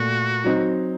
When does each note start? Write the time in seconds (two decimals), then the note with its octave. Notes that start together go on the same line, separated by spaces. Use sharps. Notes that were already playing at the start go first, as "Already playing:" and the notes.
Already playing: A#2 A3 F#4
0.44 F#3 C4 D#4